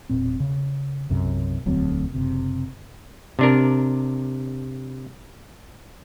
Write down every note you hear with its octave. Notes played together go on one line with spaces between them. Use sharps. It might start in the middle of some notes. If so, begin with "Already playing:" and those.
E1 A#2 C4
C#3
B1 F#2 C3
E1 D2 F#3 C4
F#1 C3
C3 D4 A#4